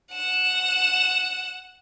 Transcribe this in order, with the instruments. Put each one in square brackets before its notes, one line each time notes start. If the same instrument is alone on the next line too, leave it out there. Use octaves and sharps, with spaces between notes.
[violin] F#5 E7